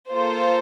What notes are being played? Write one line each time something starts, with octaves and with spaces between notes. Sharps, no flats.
A#3 F4 A4 C5